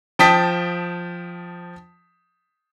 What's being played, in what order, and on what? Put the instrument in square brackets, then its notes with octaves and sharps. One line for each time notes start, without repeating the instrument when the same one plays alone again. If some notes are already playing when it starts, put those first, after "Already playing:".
[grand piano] F3 G5 A5 D#6 B6